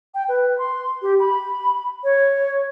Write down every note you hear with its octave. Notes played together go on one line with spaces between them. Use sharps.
G5
B4
C6
G4
B5
C#5